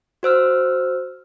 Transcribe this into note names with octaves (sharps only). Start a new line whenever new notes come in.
F#4 C5 E6 F6